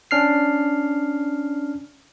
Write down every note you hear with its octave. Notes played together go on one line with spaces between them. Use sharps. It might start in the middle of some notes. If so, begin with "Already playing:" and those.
C#4 D4 F6 C7